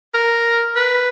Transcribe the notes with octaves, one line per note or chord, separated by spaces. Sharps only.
A#4
B4